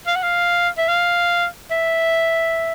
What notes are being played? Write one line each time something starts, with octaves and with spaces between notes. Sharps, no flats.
F5
F#5
F5
E5
F5
E5